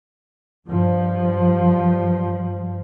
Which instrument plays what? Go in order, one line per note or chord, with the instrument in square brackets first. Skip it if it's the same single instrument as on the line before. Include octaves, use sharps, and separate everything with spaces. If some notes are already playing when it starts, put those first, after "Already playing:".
[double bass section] G2 F3